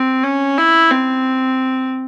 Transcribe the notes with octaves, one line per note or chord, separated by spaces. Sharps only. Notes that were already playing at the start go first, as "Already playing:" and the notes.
Already playing: C4
C#4
E4
C4